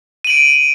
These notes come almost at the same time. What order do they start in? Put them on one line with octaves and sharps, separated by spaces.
D#7 F#7 D7